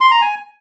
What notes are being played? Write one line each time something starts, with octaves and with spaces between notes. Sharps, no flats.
C6
A#5
G#5